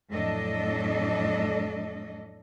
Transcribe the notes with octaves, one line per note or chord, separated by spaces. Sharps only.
F2 A2 F#3 D4 A4 D#5